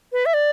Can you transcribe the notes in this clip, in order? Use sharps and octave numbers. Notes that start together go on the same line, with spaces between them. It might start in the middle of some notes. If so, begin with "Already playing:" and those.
B4
E5
D5